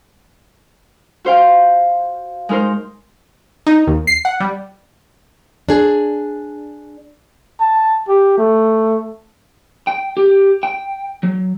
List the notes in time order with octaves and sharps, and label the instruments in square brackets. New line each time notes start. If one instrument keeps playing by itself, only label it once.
[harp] F#4 C5 F5 G5
G#3 D#4 A#4 C5
[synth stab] D#4
D#2
C7
F#5
G3
[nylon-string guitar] D4 G#4
[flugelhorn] A5
G4
A3
[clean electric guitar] G5
G4
G5
F#3